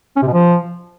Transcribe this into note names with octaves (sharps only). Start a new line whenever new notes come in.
C#4
C3
B2
F3